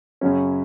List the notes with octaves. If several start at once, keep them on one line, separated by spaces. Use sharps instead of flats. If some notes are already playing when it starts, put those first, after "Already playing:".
F#2 C#3 F#3 C#4